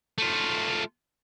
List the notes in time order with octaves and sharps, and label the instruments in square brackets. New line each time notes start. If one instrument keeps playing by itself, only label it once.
[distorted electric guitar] A3 F4